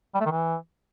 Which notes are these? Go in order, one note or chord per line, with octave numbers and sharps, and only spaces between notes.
G3
A3
D#3
E3